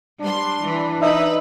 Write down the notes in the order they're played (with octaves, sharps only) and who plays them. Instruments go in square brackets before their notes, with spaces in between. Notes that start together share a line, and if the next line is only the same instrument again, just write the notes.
[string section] G3 C6 [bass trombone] D4
[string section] E3
[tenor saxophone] D#4 [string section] B4 [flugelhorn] E5